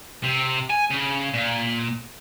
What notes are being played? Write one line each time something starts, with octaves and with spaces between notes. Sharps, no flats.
C3
G#5
C#3
A#2